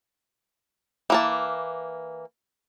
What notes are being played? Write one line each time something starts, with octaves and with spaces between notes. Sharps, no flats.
E3 A#3 A5